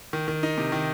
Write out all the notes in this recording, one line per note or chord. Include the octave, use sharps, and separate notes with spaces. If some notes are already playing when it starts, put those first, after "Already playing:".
D#3
D#3
D#4
C3
D#3